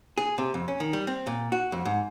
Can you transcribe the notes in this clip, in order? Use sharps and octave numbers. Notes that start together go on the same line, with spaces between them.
G#4
C3
F2
C#4
D#3
G3
C4
A#2
F#4
F2
G#2